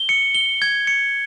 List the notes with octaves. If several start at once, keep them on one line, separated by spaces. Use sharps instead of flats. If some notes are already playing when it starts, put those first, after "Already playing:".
Already playing: G7
C#7
G7
G#6
C#7